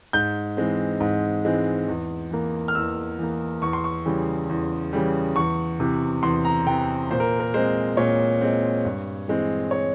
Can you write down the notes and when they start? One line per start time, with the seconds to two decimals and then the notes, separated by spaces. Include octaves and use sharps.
0.13 G#2 G6
0.57 E3 G#3 C4
1.00 G#2
1.45 E3 G#3 C4
1.88 E2
2.31 E3 A#3
2.68 F6
2.75 E2 E6
3.19 E3 A#3
3.62 E2 C#6
3.73 C6
3.84 C#6
4.05 C#3 E3 G3
4.49 E2
4.93 C#3 E3 G3
5.36 E2 C#6
5.80 C3 E3
6.23 E2 C6
6.45 A#5
6.66 C3 E3 G5
7.10 A#2 C5
7.20 A#4
7.40 A#4
7.54 G#3 C4 C5
7.97 A#2 C#5
8.41 G#3 C4
8.85 G2
9.28 E3 G#3 C4
9.71 C#5